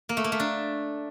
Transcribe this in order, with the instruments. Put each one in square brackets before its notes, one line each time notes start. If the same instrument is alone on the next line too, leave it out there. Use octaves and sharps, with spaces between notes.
[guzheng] A#3
A3
A#3
A3
D4